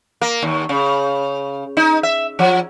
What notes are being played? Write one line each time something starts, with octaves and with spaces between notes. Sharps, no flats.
A#3
D#2
C#3
D#4
E5
F3